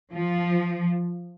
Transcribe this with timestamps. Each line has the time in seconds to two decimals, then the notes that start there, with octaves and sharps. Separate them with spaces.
0.12 F3